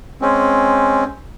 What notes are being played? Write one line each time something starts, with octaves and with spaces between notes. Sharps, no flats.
G#3 C4 C#4